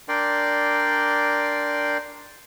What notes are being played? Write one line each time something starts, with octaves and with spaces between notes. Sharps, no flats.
D4 A#4 D5 G5 C6